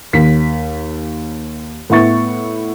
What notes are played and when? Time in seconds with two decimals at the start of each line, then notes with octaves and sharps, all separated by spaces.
0.13 D#2 B6
1.90 A2 B3 E5 C#6 A6